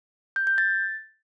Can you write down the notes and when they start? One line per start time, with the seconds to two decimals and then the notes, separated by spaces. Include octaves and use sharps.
0.36 G6
0.47 G6
0.58 A6